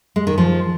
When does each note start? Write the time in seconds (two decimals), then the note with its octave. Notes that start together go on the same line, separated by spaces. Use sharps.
0.16 G#3
0.27 D#3
0.38 F3